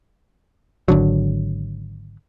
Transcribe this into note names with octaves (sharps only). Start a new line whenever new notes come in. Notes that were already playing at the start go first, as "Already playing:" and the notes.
G#1 D3 F#3